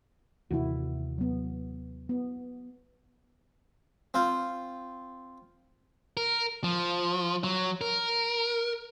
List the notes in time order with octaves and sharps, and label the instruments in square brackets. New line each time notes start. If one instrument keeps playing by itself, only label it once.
[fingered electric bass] D#2 C3 E3 [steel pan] E4 F#4
[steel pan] F#3 B3
B3
[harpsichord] C4 F4
[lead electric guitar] A#4
F3
F#3
A#4